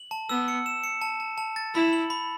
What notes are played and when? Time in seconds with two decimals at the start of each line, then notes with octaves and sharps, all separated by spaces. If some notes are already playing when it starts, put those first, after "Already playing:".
Already playing: F#7
0.11 A5
0.29 B3 E6
0.48 C#7
0.66 E7
0.84 C#7
1.01 A5
1.20 A5
1.38 A5
1.56 A6
1.74 E4 B5
1.93 F#7
2.10 B5